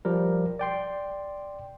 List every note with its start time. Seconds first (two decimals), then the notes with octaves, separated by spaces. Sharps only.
0.05 F3 G3 A#4
0.59 D5 G5 C6